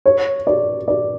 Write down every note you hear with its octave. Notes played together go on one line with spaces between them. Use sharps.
C#5
D5
D5